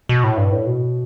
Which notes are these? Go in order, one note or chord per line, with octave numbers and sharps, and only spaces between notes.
B2
A2
G2
A2
B2